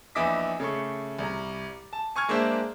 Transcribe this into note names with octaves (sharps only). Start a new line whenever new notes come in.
A#1 E2 E4 D#5 D6 B6
C#3 A3 C#6
C2 A#5
A5
G#5 C#6 F6 G#6
G#3 A#3 D4 C5 E5